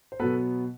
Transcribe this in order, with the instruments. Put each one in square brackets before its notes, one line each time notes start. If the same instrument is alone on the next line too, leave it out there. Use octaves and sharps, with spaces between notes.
[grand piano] C5
B2 F#3 B3 A4 B4